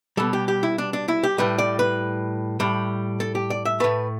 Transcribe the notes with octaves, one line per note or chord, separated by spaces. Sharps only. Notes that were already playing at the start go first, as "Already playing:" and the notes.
B2 G3 A4
G4
G4
E4
D4
D4
E4
G4
A2 G3 B4
D5
B4
A2 G3
A4
G4
D5
E5
A2 A3 B4